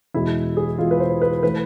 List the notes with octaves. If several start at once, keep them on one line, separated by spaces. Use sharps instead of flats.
E2 B2 G#3 E4
G#4
E2 B2 G#3 F4
B4
C5
B4
E3 A3 B4